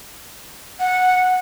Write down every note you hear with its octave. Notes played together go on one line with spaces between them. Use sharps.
F#5